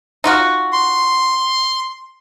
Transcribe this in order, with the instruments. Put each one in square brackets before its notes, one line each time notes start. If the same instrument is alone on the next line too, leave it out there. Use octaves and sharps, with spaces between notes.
[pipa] D#4 F4 F#4
[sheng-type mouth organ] C6